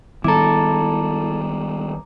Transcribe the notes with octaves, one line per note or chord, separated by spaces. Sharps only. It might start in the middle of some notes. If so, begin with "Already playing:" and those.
D#3 G3 B3 E4 A4 A#5 D6